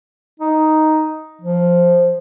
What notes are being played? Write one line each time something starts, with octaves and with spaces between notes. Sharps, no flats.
D#4
F3